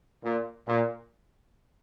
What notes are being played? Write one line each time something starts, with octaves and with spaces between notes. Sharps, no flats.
A#2
A#2